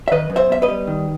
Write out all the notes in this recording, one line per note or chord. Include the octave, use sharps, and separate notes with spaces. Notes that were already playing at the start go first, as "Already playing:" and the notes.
E5
D#3 B4 D#5
F#2
C5 E5
B3 E5
B4 D#5
G3
D#3